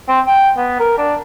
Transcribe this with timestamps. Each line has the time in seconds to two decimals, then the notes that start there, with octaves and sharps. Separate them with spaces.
0.08 C4
0.27 G5
0.57 B3
0.80 A#4
0.98 D4